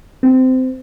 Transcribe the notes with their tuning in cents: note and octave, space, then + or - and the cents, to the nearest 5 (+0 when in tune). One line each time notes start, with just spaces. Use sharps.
C4 -20